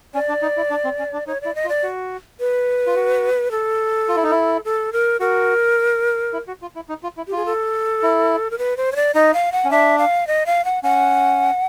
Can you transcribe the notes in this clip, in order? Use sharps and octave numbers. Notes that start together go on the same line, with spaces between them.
C#4 D5
D4
D#4
E4
D4
C4
C#4
D4
D#4 C#5
E4 D5
D#5
F4
D5
F#4
B4
F4
F#4
A4
F4
E4
D#4
E4
A4
A#4
F#4 A#4
E4
F#4
F4
E4
D#4
F4
E4
G4
F4 G#4
A4
E4
A#4
B4
C5
C#5
D5
D#4 D#5
F5
F#5
C#4
D4 E5
F5
D#5
F5
F#5
C#4 F#5